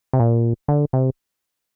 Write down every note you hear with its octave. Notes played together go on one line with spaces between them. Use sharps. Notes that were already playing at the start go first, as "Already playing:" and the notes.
C3
A#2
D3
C3